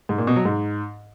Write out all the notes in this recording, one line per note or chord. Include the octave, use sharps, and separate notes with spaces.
G#2
A#2
B2
F#3
G#2